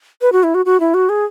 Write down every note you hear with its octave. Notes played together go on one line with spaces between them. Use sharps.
B4
F#4
E4
F#4
F#4
E4
F#4
G#4